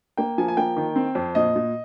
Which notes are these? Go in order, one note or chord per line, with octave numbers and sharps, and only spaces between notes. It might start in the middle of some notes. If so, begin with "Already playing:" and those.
A#3 G5
F3 G#5
G#5
A#3 G5
D#3
C4
F2
A#2 D#5
A#2